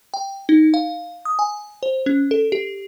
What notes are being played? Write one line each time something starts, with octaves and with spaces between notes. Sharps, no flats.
G5
D#4
F5
D#6
G#5
C5
C#4
A4
G4